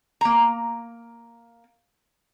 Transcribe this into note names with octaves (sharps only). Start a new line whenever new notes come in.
A#3 A#5